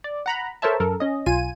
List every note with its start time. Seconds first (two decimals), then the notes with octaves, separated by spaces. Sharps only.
0.04 D5
0.26 F#5 A#5 B5
0.62 A4 A#4 C5 C#5 E5 A5
0.80 F#2 A4 A#4
1.00 C#4 D#5
1.26 B1 F4 G#5 D#7